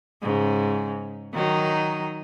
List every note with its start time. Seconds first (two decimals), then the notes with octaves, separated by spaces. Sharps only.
0.22 G#2 C#3
1.33 D#3 F#3 D#4